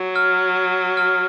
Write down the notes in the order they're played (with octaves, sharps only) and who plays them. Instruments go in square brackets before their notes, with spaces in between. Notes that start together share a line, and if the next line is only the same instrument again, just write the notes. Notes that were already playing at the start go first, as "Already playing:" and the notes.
Already playing: [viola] F#3
[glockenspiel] F6
F6